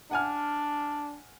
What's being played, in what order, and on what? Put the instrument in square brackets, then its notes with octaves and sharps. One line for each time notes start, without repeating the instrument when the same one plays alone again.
[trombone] D4 [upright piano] F#5 G#5 F6